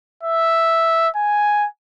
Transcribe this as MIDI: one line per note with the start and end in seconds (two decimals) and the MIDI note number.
0.23 1.08 76
1.16 1.66 80